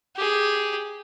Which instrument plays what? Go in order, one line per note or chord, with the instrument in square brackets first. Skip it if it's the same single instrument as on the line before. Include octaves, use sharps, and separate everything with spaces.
[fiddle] G4 G#4